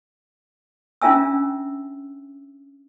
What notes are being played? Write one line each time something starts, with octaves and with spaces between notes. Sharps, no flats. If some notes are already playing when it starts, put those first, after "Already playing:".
C#4 D4 F4 E5 G#5 E6